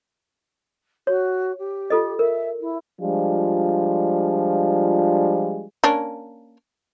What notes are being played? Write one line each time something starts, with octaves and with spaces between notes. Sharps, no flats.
F#4 C#5
G4
F4 A4 D#5
A#4 E5
E4
F3 G3 G#3 D4 F4
A#3 C#4 D4